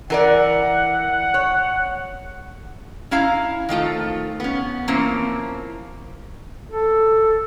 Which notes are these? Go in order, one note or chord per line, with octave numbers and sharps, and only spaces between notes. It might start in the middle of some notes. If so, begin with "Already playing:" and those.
E3 A#4 D5 F#5
C#5
C#4 E4 F5 A#5
D#3 F3 A3 F4
B3 C#4
E3 F3 A#3 C4 C#4
A4